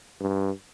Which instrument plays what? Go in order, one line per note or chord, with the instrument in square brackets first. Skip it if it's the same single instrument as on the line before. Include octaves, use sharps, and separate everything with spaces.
[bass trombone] G2